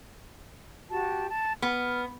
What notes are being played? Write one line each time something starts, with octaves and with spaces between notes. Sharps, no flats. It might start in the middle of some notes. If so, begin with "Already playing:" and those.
F#4 G4 A5
A5
B3 F6